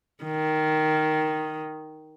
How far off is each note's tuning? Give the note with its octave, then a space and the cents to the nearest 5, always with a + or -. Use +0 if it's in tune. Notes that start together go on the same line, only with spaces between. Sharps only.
D#3 +0